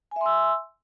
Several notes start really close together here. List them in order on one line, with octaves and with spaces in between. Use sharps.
G#5 E5 C6 E6